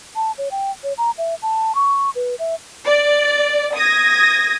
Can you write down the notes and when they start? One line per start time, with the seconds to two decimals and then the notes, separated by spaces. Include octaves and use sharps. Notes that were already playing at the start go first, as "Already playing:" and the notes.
0.16 A5
0.38 C#5
0.51 G5
0.84 C#5
0.98 A#5
1.18 E5
1.42 A5
1.75 C#6
2.15 B4
2.39 E5
2.87 D5
3.76 D#6 G#6 A#6